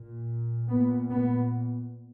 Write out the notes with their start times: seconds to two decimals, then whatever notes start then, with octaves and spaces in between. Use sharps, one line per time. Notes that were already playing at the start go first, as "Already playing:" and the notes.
Already playing: A#2
0.69 A#2 B3
1.10 B3